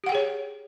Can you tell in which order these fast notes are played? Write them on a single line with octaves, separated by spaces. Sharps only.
G4 F#5 G5 G#4 C#5